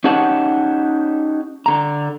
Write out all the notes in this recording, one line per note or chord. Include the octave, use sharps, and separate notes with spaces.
C#4 D#4 G4 C#5 F#5 A5
D3 A#5